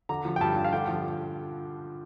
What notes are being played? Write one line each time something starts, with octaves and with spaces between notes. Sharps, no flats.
D3 A#5
F3
G5
G2 A5
G2
F5
D3 G5
F3